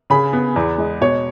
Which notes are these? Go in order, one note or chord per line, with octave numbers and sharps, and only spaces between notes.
C#3 G#5 B5
B3
E2
G#3
B2 C#5